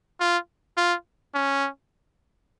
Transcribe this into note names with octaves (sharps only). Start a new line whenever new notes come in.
F4
F4
C#4